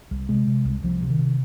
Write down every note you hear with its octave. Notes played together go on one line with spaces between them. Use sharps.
C2
C3 G#3
C3
C2
C2 F3
C3
D#3
C3